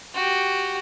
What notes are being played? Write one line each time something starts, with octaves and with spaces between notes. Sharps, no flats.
F#4 G4